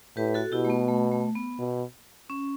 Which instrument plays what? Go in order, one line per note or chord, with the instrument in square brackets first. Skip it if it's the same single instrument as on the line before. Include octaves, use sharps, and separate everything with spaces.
[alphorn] A2 [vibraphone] G4 B4
[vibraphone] F#4 A4
[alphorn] B2 [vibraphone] E4 G4
[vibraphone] A3
B3
A3
A3
B3
[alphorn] B2
[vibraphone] C#4